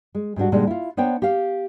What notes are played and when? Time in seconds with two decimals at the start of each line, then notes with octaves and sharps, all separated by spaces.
0.15 G#3
0.36 G#2 G3 D4 F#4
0.52 A#2 D3 G3 G#3 D#4
0.67 E4 F4
0.97 B3 D4 C5 C#5 G5
1.22 G4 F5